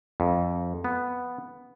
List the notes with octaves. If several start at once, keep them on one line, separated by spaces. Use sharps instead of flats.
F2
B3